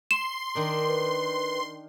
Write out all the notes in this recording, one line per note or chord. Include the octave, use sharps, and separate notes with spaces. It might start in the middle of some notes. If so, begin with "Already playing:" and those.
C6 E7
D#3 D4 A#4
B4